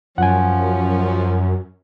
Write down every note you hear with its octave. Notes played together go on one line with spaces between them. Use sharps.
F#2 F3 C#4 F#5 G#5